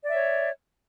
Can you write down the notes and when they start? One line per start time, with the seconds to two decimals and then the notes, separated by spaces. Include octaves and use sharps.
0.03 D5
0.08 E5
0.12 C#5